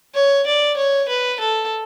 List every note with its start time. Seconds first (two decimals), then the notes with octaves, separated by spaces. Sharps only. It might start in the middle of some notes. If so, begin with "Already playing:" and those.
0.15 C#5
0.47 D5
0.77 C#5
1.08 B4
1.40 A4